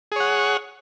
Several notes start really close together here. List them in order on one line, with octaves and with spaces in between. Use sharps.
G#4 C#5 F#5